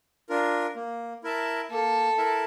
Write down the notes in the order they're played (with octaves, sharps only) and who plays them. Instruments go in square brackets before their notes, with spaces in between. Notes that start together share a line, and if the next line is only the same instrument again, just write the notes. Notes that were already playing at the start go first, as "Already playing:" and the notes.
[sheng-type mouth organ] D4 F4 A#4
A#3
E4 A#4 E5 A5
[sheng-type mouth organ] A#3 [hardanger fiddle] A4
[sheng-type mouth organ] E4 A#4 E5 A5